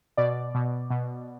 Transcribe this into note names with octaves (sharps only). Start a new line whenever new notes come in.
B2 D5
B2
B2